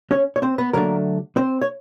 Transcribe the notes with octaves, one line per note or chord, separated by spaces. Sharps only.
C#4 C#5
C#5
C4 C5
B3 B4
D3 F#3 A3 A#3 D4 A#4
C4 C5
C#5